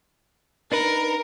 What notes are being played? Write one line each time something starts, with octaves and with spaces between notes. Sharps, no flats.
D4 D#4 A#4 B4